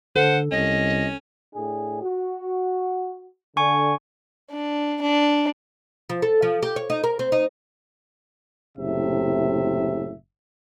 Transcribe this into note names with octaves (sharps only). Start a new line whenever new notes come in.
D3 A4 C5 F#5
C2 C#4 D#5
A2 D4 G#4
F#4
D3 G#5 C#6
D4
D4
F3
A4
F3
G4
C#5
D#4
A#4
C4
D#4
F#1 A2 C3 E5